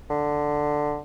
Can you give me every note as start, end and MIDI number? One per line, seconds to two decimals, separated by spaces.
0.10 1.00 50